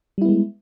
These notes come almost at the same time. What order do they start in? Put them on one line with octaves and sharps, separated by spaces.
G3 E4 B3 G#3